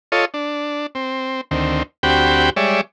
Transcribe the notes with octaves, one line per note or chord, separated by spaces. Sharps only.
F4 A4 C#5 D#5
D4
C4
D2 D#3 C4
D2 C4 F#4 G4 G5 B5
G3 G#3 C#5 D5 E5